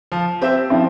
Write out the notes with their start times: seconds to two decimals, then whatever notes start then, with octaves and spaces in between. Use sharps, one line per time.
0.12 F3
0.41 C4 G4 C5 E5
0.70 F3 C4 E4